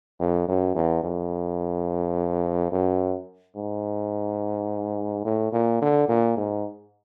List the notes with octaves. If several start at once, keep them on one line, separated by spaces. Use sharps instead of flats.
F2
F#2
E2
F2
F#2
G#2
A2
A#2
D3
A#2
G#2